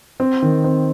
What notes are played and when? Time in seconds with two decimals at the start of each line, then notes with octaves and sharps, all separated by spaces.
0.20 C4
0.42 D#3
0.64 C4